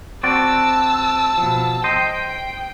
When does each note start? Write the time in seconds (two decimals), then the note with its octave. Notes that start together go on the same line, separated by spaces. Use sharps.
0.23 C4 F#4 D5 A5 E6
1.38 B2 F3
1.84 C5 D#5 G5